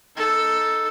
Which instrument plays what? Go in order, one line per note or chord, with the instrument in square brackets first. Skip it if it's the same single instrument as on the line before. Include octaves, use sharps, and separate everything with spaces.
[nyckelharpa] D#4 A4